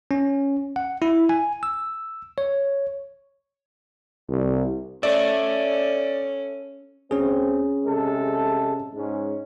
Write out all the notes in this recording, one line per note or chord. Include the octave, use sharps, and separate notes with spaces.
C#4
F#5
E4
G#5
E6
C#5
C2
C#4 A4 D5 E5
D2 C4 C#4 G#4
C3 G#3 A4
G#2 G#3 C#4